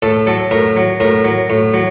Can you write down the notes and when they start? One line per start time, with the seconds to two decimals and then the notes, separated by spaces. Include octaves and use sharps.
0.02 A2 A4
0.27 F#3 A4
0.51 A2 A#4
0.77 F#3
1.00 A2 A#4
1.25 F#3
1.50 A2
1.74 F#3